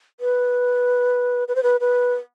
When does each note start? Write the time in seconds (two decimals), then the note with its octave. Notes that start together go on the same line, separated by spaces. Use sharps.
0.20 B4
1.48 B4
1.56 C5
1.63 B4
1.80 B4